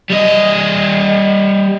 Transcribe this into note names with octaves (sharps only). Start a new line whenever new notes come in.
G3 D#5